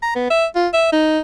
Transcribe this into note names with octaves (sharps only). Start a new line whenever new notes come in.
A#5
B3
E5
F4
E5
D#4